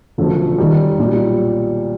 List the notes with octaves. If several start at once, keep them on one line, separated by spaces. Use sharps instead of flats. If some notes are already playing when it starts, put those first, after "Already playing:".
E1 D2 C#3 F3 A3
D#2 D#3 G3
B1 A#2 G3